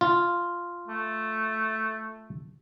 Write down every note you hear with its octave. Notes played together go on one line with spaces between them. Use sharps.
F4
A3